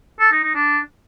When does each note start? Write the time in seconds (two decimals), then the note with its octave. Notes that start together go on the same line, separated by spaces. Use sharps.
0.20 A4
0.32 D#4
0.43 D#4
0.55 D4